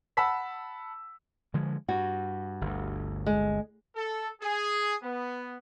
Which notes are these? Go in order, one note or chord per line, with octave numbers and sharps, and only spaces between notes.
F#5 A5 B5 E6 B6
D3 F3 G#3
G2 F#4
G1 D2
G#3
A4
G#4
B3